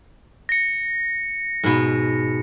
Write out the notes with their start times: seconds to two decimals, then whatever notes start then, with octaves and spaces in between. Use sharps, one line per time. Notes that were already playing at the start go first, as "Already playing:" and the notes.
0.49 A#6 C#7
1.64 G#2 B2